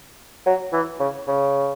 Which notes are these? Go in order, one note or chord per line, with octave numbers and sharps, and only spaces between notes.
F#3
E3
C#3
C#3